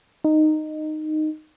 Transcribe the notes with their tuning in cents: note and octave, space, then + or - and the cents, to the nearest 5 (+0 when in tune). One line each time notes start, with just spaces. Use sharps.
D#4 -10